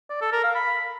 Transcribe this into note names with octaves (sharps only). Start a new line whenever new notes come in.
D5
A4
A#4
F5
B5